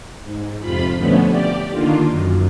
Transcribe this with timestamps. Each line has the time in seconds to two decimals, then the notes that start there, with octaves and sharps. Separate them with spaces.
0.24 G#2
0.59 F2 C3 F4 B5
0.95 B2 D3 F3 A3 B3 C#4
1.26 G4 D5
1.70 D3 D#3 A#3 F4
2.09 F#2